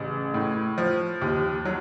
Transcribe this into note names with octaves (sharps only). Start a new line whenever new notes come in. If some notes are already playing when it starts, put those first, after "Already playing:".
Already playing: A1 C#3
A2
F3
D#2
F#3